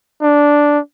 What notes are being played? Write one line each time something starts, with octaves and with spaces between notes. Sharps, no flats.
D4